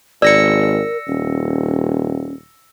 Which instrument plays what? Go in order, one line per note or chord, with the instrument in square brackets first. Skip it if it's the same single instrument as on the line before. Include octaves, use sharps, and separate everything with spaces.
[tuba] G#1 [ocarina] A#4 [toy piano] D5 [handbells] E6 A#6 C#7
[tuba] D#1 [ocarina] C#4